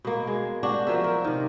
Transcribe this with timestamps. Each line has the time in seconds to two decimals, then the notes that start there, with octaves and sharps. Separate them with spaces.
0.05 B2 A#3
0.27 G#3
0.63 D4 F#4 G4
0.87 F3 F#3 A#4 E5
1.04 A#4
1.24 C3 D#3